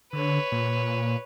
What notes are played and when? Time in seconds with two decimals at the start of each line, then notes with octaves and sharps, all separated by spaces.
0.13 D3 B4 C#5
0.52 A#2